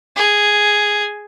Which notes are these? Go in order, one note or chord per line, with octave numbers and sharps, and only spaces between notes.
G#4